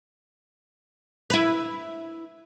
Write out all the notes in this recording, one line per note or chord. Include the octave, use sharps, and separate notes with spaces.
E4 B4